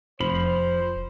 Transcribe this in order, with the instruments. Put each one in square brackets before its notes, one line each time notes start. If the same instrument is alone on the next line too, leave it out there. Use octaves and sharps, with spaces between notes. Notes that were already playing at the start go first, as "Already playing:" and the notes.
[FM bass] F1 [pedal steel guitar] F3 B5 [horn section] C5